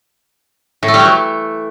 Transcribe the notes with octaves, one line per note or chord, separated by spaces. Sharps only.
A2
A3
G3
F#3
E3